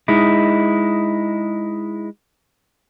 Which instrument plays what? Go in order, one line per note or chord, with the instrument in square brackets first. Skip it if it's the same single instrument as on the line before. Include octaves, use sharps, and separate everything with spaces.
[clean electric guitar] G#3 D#4 E4